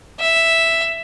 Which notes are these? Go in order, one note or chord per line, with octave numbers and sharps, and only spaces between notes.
E5